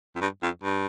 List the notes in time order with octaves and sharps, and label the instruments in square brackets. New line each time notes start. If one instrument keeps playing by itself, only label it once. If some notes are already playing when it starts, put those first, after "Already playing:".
[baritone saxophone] F2
G2
F2
G2